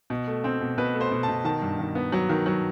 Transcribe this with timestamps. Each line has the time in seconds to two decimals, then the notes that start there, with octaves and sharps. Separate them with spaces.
0.10 B2
0.28 A3
0.44 C4
0.61 B2
0.78 B2 B4
0.95 A3
1.01 C5
1.11 B2
1.23 A5
1.28 B2
1.45 D#3 A5
1.62 G2
1.79 D#3
1.95 B3
2.12 F#3
2.29 D#3
2.46 F#3